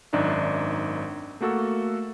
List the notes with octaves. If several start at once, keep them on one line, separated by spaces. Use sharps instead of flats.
G#1 F#2 D4 D#4 E5
A3 A#3 F#4 A4 E6